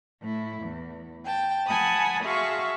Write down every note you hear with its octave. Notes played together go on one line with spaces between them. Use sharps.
A2 E4
E2
G5 A5
F#5 G#5 A5 B5 D#6
F#4 G#4 E5 F5 C6 C#6